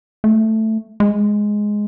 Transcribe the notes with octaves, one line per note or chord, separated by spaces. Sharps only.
A3
G#3